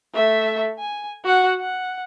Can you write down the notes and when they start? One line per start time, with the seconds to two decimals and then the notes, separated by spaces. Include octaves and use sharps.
0.14 A3 E5
0.79 G#5
1.24 F#4 F#5
1.60 F#5